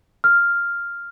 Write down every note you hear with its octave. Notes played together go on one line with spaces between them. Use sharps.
F6